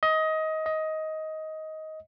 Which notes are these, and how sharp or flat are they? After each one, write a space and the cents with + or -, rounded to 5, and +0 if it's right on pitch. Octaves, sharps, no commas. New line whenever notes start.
D#5 +20
D#5 +15